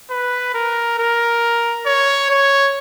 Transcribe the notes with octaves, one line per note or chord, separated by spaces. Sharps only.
B4
A#4
A#4
C#5
C#5